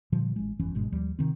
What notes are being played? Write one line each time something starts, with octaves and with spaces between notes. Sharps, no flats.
A#2 D3 F3 G3
A1 G#3
G1 F2 E3 C#4
G1 G#2 B2 G#3
D#2 F3 G3
C3 D#3 C4